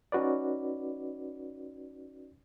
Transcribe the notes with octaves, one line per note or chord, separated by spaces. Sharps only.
C#4 D#4 F#4 B4 D5